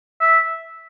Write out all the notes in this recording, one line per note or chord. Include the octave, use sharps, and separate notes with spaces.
E5